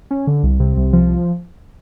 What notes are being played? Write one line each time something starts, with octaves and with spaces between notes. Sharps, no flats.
C#4
D3
C2
C3
C2
F3